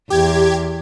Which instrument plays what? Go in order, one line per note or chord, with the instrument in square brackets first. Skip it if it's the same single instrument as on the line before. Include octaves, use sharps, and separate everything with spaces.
[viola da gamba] E2 [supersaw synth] G4 G#6